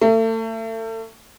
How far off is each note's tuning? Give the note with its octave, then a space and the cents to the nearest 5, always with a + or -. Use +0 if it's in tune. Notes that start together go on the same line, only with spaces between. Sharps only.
A3 +35